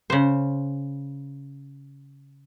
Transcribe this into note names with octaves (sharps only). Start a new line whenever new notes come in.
C#3 C5